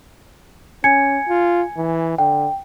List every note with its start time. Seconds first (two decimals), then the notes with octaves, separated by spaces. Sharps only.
0.84 C#4 G#5 G#6 C#7
1.29 F4
1.77 E3
2.18 D3 G5